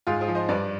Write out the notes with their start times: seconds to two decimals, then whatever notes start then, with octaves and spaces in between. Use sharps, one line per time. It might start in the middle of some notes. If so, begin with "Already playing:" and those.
0.07 G#2 F4 G#4
0.21 G#4 C5
0.28 F3
0.35 C5 D#5
0.49 G2 B4 D5